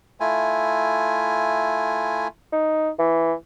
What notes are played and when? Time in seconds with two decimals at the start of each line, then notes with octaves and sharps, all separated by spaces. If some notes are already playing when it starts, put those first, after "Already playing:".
0.20 A3 E4 F4 G#5
2.52 D#4
2.99 E3